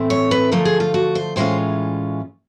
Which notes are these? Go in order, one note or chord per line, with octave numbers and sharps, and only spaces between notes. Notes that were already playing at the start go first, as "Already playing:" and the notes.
Already playing: A2 E3 A3 C4
C#5
B4
D3 F3 A3 A#4
G#4
F4
F#4
C5
A2 E3 G#3 C#4 F4 C5